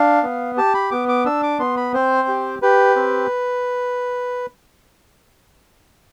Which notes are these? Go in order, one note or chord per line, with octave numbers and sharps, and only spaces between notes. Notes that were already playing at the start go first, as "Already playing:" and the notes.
Already playing: D4 F5
B3
G4 A5
B5
B3 D6
D6
D4 E6
D6
B3 C6
B5
C4 C5
G4
G4 B4
C4